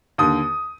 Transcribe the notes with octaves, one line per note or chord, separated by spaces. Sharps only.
D#2 D3 D#6